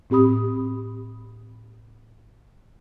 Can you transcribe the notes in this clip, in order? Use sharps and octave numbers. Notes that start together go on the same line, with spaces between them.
A2 C4 G4 B5 D#6